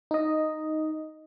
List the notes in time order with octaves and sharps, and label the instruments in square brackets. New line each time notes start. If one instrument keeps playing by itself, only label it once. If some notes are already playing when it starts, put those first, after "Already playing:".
[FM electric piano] D#4 D#5